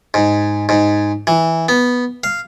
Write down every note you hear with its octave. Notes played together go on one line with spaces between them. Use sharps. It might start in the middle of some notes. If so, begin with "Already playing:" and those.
G#2
G#2
E3
B3
F5